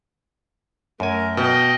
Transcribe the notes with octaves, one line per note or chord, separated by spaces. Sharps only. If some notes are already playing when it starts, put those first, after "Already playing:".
F#2 A3 A#4 G#5
B2 D#5 G5